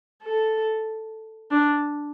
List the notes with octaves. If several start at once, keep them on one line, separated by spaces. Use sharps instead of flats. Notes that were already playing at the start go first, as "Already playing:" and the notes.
A4
D4